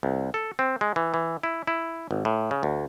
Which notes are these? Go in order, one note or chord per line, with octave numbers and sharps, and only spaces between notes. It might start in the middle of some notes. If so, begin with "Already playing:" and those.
C2
A4
C4
G#3
E3
E3
E4
E4
G#1
A2
C#3
D2